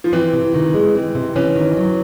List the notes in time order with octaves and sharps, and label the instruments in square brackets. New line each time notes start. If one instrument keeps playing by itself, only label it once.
[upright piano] F3
[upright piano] E3 [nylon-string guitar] C4
[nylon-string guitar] C3
D#3
G#3
C4
C3
[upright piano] E3 [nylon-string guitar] C#4
[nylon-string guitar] D#3
F#3